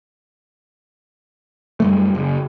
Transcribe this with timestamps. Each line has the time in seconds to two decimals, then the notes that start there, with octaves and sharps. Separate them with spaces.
1.80 F#2 G3 A3
2.15 F#1